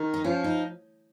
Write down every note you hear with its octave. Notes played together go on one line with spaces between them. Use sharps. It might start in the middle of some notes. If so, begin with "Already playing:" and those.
Already playing: D#3
D#4
F3 C#4
D#4